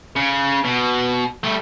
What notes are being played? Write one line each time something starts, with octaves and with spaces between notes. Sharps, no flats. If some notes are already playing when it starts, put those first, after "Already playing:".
C#3
B2
G3 A3